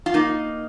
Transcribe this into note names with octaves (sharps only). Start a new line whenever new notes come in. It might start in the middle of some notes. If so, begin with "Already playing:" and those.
F4
A#3 D#4